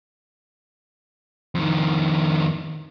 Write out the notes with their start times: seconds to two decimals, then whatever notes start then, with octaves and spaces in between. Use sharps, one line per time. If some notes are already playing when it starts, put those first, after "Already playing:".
1.55 F2 D#3